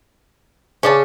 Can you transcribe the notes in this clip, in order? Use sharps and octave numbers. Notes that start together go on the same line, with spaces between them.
C#3 C#4 D5 A5